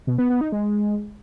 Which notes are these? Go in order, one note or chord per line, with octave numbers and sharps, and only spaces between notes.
B2
B3
B3
D#4
G#3